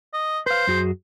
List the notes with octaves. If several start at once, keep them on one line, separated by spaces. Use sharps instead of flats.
D#5
B4 C5 F5
F#2 F#4 G#4